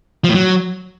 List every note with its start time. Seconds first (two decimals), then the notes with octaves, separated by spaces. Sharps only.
0.24 F3
0.29 A2
0.35 F#3